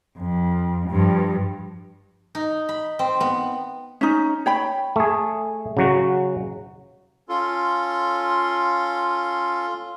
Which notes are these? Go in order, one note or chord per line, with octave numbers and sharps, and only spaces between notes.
F2
G2 F3
D#4
B5
C4
B3
C#4 D#4
C#5 G5 B5
A3 G#4
C#3 F#3 F#4
C#4 F4 A4 C6